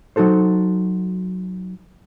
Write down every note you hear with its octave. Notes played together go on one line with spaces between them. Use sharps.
F#3 D#4 F#4 A4 C5